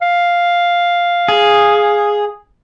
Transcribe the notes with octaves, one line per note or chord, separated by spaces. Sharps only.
F5
G#4